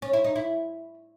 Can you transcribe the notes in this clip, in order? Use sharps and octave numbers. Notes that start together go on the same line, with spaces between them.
C#4
E4
D#4
E4